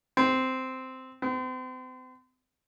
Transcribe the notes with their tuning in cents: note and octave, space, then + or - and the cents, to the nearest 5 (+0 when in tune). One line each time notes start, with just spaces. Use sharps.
C4 -10
C4 -40